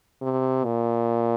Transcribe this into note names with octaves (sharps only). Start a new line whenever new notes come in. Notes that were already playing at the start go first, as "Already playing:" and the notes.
C3
A#2